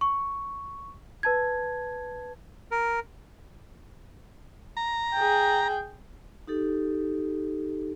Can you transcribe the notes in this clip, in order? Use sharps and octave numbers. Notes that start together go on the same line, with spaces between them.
C#6
B4 A5 G#6
A#4
A#5
G#4 G5
D#4 G4 A4